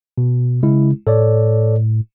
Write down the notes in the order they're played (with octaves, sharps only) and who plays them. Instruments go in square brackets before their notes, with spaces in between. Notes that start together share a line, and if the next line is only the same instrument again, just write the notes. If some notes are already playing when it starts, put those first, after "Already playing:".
[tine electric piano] B2
[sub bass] C#3 [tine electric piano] G#3 E4
[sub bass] A2 [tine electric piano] A4 C#5 D5